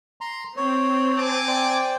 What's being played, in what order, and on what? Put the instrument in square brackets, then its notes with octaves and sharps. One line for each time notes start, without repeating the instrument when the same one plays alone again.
[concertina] A#5 C6
[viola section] C4 [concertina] C#5
[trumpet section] G#5 A5 D6
[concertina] C5 D5 G5